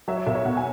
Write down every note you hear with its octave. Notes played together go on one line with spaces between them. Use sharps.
F#3 E5
C#5
B1 E5
C#5
B2 F#5
G#5